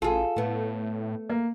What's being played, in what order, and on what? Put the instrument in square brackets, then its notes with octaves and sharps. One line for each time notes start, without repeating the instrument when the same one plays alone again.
[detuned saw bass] A1 [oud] F4 G#4 [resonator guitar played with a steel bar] A4
[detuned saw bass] A2 [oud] A3 B3
[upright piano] A#3